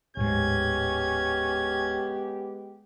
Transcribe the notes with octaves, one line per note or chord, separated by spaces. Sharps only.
D1 G#2 G#3 B3 C#4 G4 G#6